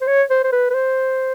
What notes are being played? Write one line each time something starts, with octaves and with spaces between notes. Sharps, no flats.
C5
C#5
C5
C5
B4
B4
C5